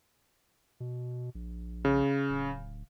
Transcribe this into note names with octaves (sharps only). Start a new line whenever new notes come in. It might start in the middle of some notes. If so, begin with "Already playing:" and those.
B2
A#1
C#3
D1